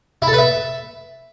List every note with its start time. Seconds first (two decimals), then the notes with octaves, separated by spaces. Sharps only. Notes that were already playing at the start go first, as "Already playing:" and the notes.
0.22 E4
0.28 A4
0.33 B4
0.38 E5